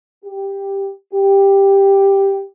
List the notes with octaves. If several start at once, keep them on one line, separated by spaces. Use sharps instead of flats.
G4
G4